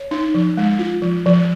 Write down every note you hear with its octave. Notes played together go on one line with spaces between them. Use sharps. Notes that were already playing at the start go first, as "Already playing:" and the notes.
Already playing: C#5
D#4
F3
G#3
F4
F3
F3